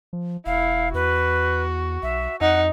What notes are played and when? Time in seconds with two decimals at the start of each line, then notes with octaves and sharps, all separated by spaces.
0.13 F3
0.46 E1 E4 F5
0.94 E2 F#4 B4
2.03 B1 E5
2.41 F2 D#4 F#5